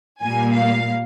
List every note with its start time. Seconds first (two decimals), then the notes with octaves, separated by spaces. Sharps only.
0.22 A#2 G3 A#3 G#5
0.55 F5